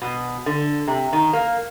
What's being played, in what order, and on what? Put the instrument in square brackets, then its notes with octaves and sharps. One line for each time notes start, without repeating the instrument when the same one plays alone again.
[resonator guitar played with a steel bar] B2
D3
C3
D#3
A#3